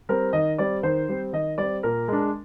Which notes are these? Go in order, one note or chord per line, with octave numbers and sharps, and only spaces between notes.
G3 C4 A#4
D#3 D#5
G3 C4 D5
D#3 C5
G3 C4
D#3 D#5
G3 C4 D5
A#2 A#4
G#3 D4